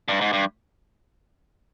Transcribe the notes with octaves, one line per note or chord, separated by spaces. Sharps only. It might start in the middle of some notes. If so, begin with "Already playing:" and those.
G2
G#2
G2